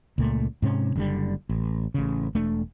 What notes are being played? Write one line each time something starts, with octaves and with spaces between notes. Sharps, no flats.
C#2 A#2 A3
G#2 C3 C#4
F#1 D3 G3
A1
A1 C#3
E1 A3 D4